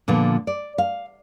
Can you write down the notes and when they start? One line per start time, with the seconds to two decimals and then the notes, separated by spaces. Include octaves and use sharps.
0.08 A#2 D3 F3 B3
0.47 D5
0.78 F5